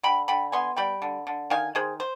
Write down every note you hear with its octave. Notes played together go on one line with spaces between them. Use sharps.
D3 G5 B5
D3 G5 B5
B3 G#5 C6
G3 G5 B5
D3
D3
D#3 F5 G#5
D#3 G#4 C5
C5